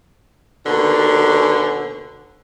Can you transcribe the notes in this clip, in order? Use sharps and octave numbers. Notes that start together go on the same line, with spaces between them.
D#2 B2 D3